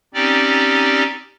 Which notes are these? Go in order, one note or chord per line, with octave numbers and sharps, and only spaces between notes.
C4 C#4 D#4 G4 D5